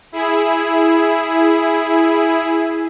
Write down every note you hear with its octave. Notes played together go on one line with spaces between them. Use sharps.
E4 G#4